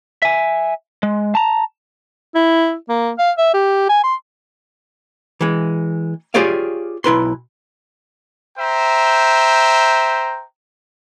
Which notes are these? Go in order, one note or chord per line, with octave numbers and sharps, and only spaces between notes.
E5 G#5
G#3
A5 A#5
E4
A#3
F5
E5
G4
G#5
C6
E3 G#3
F4 G4 G#4 C#5 D5 F5
B1 E4 B4 C6
C5 E5 G5 A#5